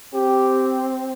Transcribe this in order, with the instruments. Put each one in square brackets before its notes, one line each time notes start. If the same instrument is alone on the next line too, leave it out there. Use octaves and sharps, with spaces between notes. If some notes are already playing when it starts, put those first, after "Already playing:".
[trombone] C4 [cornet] G4